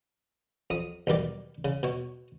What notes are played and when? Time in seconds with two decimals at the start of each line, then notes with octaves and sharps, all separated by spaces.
0.70 F2 D#6
1.07 B1 G2 D#3 D5
1.65 C#3
1.83 B2 C#5